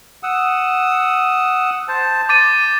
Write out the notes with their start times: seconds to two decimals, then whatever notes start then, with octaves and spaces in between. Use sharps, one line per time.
0.23 F#5 D#6 E6
1.88 C5 A5
2.29 D6 G6 A6 D#7